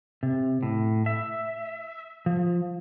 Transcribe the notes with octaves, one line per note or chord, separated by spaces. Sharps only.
C3
A2
E5
F3